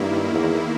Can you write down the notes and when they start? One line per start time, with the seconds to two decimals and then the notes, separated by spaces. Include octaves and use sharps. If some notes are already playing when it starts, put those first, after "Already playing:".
Already playing: G2 D#3 A#3 E4
0.32 E2